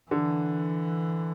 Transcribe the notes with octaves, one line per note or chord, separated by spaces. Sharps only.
D3 E3